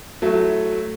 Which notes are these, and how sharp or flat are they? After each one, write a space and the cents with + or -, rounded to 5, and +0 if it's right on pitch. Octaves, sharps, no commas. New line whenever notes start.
F#3 +0 A3 +0 E4 +0